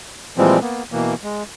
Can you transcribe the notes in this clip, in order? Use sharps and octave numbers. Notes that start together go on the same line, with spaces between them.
A#2 E3 F3 G3 G#3 C4
A#3 B3
B2 E3 A#3
G#3